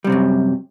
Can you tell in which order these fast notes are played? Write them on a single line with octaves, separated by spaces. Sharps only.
G3 C3 C4 F#2